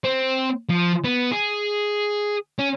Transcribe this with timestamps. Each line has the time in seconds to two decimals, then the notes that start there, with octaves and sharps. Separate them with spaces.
0.04 C4
0.70 F3
1.04 B3
1.32 G#4
2.59 C#4